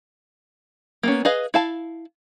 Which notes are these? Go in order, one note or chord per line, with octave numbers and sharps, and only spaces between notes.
A#3 B3 C#4
G#4 B4 D#5 F5
E4 F5 A5